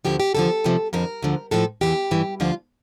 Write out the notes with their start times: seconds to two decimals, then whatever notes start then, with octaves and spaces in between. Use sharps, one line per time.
0.05 D2 D3 F3 G4
0.20 G4
0.35 E2 D3 F3 A4
0.64 D2 C3 F3
0.93 F2 D3 F3 A#4
1.22 D2 D3 F3
1.51 A2 F3 A4
1.81 E2 E3 G4
2.11 G2 E3
2.40 D2 D3 F3 F4